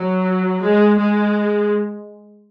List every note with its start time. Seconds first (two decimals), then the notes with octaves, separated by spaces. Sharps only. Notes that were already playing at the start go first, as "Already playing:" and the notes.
Already playing: F#3
0.60 G#3
0.98 G#3